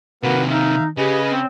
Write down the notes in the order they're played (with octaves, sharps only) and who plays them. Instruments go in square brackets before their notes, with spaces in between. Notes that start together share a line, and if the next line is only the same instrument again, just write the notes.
[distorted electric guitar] C3 D#3 [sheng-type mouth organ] A#3 F#4 B4
[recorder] D#4 [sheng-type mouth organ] E5 F5
[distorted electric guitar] C#3 [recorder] G4 [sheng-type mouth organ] G#4 B4 D#5
[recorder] C4